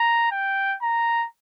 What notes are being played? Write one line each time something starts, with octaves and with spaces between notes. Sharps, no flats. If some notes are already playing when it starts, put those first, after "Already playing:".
Already playing: A#5
G5
A#5